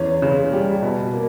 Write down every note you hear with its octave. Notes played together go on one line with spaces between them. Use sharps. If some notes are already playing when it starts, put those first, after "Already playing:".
Already playing: E2 C#4
C#3
G3
B2
A#3